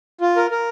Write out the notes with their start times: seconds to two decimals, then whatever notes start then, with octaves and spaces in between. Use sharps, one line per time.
0.21 F4
0.36 A#4
0.51 A#4